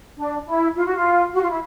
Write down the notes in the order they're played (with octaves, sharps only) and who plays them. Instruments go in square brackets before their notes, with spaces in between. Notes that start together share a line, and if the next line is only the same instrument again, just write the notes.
[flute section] D4
E4
F4
F#4
F4
F#4
F4
E4